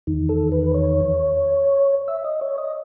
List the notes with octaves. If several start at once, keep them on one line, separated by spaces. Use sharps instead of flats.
E2 D#3
A4
B4
C#5
E5
D#5
C#5
D#5